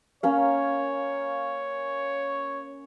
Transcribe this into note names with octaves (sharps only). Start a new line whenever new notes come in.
A#3 C#4 C#5 F5